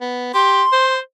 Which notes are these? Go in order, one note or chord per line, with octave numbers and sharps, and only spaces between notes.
B3
G4 C6
C5